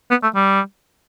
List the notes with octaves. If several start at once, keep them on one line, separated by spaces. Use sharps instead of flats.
B3
A3
G3